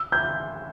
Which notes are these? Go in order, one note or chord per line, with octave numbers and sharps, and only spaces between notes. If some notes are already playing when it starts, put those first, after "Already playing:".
Already playing: E6
G6